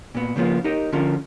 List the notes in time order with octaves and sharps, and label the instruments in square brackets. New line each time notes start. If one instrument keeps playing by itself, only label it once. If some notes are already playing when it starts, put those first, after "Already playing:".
[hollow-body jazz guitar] A#2 B3
C#3 F3 A#3 B3 F4
D#4 G4 A#4 D#5
D3 F3 C#4 F4 A#4